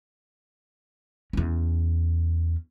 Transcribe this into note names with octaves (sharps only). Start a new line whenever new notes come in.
E2 C#4